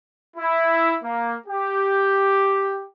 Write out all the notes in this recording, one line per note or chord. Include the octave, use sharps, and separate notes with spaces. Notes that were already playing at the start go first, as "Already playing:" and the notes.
E4
A#3
G4